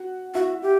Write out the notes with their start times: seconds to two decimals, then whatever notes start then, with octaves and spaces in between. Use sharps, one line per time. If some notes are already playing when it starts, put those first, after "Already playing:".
Already playing: F#4 F#5
0.34 E4 F#4 E5
0.62 G4